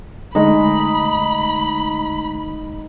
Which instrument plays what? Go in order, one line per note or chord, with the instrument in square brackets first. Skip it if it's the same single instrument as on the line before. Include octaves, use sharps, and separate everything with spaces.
[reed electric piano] D3 G#3 A3 [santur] D#4 [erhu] B5